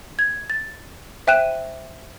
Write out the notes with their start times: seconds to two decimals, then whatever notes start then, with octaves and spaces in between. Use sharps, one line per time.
0.19 G#6
0.50 A6
1.27 C5 E5 G5 F#6 D#7 E7